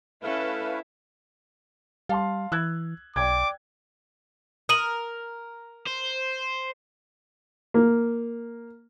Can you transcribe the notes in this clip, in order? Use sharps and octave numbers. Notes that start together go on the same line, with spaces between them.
A3 C#4 E4 A4 B4 F5
G3 F5 A5 C6
E3 E6 F#6 G#6
B1 D5 G5 D6 G#6
A#4 D#6 D#7 F#7
C5
A#3